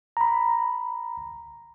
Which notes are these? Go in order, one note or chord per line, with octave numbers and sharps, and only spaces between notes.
A#5 B5